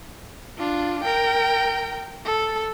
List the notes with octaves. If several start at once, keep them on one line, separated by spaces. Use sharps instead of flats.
D4 F4
A#4 G5
A4